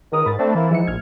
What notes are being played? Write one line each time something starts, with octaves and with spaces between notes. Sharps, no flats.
C#2 D#3 A#4 D#6
G#2 B5 A6
A3 C4 D4
E3 A#3 C4 E4
G#2 F3 E5 C#7
A#1 A2 F6 G#6